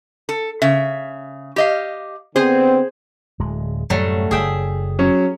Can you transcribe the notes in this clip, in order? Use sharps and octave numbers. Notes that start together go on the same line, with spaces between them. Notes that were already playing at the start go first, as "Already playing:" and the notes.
A4
C#3 E5
G4 D#5 F5
D3 B3 C4 G#4 C5
D1 G#3
F#2 A2 C3 F#3 G3 A3
F#1 G#4 E5 G5
F#3 C#4